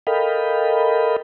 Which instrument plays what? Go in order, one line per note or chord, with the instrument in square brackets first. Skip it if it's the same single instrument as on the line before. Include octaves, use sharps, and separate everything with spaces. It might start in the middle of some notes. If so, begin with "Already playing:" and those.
[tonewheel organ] A4 A#4 D#5 F5 G5 B5